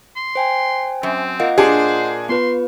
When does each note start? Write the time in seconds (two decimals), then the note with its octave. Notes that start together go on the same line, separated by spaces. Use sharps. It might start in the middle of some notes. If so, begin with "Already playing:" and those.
0.16 C6
0.35 C5 G5 G#5
1.03 F#2 C4
1.40 A#3 F4 D#5 F#5
1.58 A#2 D4 G#4 C5
2.29 B3 F4 B4 C6